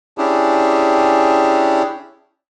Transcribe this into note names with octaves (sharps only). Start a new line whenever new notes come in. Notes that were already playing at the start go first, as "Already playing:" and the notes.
C#4 D4 E4 G4 G#4